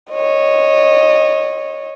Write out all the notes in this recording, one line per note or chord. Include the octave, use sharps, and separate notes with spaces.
C#5 D#5